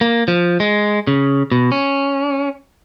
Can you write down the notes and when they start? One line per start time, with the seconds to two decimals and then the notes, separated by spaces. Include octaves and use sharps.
0.01 A#3
0.28 F3
0.60 G#3
1.07 C#3
1.52 B2
1.72 C#4